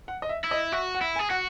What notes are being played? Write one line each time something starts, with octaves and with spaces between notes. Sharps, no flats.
F#5
D#5
E5
E4
D#5
F#4 E5
F#5
E4
G#5
G#4
F#4 F#5